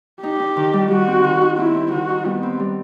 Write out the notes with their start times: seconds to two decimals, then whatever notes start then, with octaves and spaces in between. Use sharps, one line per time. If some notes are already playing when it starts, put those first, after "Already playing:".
0.23 D#4 G4
0.40 D#4
0.56 D#3
0.73 G3
0.91 G3 F#4
1.07 C4
1.24 D#3
1.41 D#4
1.58 C4 E4
1.74 C4
1.92 D#3 F#4
2.09 D#4
2.25 G3 B3
2.43 C4
2.60 G3